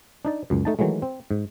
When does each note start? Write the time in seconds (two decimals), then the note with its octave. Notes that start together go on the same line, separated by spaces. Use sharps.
0.25 D4 D#4 D5
0.50 C#2 F#2
0.65 A3 D#4 A5
0.79 D#3 E3 F#3 G#3 A3
1.02 C4
1.31 G#2